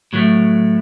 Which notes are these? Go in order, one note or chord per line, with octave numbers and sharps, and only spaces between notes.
A2 F#3 A3